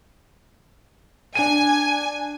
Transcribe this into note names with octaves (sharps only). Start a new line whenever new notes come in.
D4 G#5 D#7